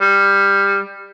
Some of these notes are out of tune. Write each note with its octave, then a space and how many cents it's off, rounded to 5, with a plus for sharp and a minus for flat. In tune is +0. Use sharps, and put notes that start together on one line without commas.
G3 +15